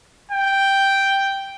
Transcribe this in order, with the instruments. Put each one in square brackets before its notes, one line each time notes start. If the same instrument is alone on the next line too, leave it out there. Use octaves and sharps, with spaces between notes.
[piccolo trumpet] G5